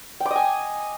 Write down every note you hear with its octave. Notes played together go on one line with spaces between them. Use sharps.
G5
D6
D#5
G#5